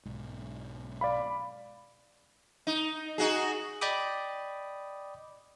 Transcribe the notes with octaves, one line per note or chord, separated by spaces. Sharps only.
B1 G#2
D5 F5 B5
D#4
D#4 F#4 G#4
D5 D#5 G5 B5 D6 D#6